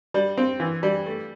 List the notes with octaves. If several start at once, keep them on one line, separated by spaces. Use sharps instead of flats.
G3
C4
E3
G3
A3